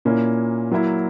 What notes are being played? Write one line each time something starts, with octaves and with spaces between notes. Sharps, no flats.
A#2 A#3 C#4 E4
F#3 A#3 E4